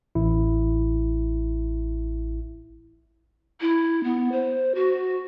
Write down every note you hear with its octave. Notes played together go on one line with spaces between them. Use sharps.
A1 E4
E4
B3
C5
F#4